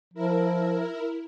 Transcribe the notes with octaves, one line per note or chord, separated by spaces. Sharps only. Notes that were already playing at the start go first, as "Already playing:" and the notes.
F3 E4 A#4